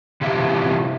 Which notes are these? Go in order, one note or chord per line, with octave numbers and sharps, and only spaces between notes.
C3 E3 F4 G4 E5